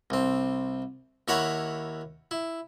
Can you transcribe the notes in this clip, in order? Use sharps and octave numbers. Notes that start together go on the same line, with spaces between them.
C2 C4
D#2 E4 C#5 F#5 A#5 B5
E4